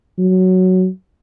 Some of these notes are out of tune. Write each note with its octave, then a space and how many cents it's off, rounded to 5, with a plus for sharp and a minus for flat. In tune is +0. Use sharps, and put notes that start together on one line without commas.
F#3 +5